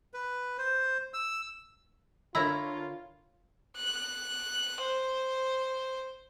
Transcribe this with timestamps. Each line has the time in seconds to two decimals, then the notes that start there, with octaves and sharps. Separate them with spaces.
0.14 B4
0.58 C5
1.14 E6
2.35 D3 E4 F4 A#4 C#5 A#5
3.76 F#6
4.81 C5